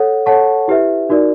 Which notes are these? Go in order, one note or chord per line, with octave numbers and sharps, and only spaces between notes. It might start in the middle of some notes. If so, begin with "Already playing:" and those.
Already playing: A4 C#5 F#5
A4 C#5 F#5 A5 C#6
E4 G4 B4 E5
D#4 F#4 A#4 D5